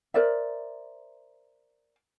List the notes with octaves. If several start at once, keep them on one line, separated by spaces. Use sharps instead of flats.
A#4 C5 D5 E5